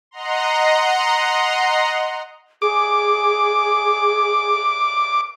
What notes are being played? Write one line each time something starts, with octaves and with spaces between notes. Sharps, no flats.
D#5 F#5 A#5 C6
G#4 D6